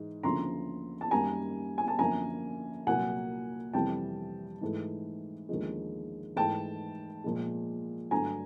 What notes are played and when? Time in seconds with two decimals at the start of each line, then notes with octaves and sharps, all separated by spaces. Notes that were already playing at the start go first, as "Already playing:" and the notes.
Already playing: G#2 E3 G#3
0.23 D2 C#3 F3 A#3 A#5 C6
1.01 A5
1.11 F#2 D#3 G3 A#3 G#5 A#5
1.78 G#5
1.88 A5
1.99 F#2 D3 F3 A#3 G#5 A#5
2.86 C2 A#2 F#3 A#3 F#5 G#5
3.73 F2 C3 E3 G3 G5 A5
4.61 G#2 E3 A3
5.49 D#2 D3 F3 G#3
6.36 G#2 E3 A3 G5 A5
7.24 A#2 F3 G#3
8.11 G2 D3 F#3 A3 G#5 A#5